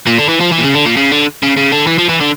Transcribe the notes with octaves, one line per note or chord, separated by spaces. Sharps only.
A#2
D3
E3
F3
E3
A#2
C#3
D3
A#2
C#3
D3
C#3
C#3
D3
E3
F3
E3
D3